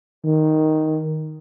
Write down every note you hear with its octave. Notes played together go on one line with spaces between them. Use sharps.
D#3